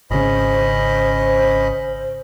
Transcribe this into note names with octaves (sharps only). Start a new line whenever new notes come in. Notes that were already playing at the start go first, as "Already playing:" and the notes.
G#1 C#3 C#4 C5 D#5 B5